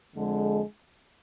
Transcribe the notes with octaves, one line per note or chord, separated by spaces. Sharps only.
F2 D3 G#3